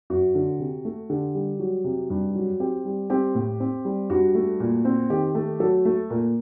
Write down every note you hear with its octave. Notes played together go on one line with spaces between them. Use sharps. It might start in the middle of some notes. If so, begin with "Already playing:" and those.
F#2 F#4
D3
C3
A3
D3 G4
G3
F#3
C3
G2
F#3
C4 G4
G3
C4 G4
A2
C4
G3
G2 F#4
A3
A#2
C4
D#3 G4
A3
F#3 A4
A3
A#2 A#4